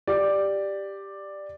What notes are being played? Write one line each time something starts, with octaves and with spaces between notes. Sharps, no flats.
G4 D5